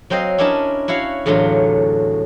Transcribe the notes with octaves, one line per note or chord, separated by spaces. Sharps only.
F#3 C4 C5 D#5 F5
C#4 D4 E4 A#4 D#5 A5
E4 F#4 C#5 F5
E2 A2 D3 F#3 F4